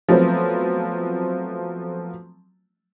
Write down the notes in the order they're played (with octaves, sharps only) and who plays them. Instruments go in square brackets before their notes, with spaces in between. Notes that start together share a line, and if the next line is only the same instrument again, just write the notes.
[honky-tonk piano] F3 F#3 A3 B3 C4